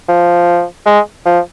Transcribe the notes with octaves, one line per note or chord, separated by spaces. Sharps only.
F3
G#3
F3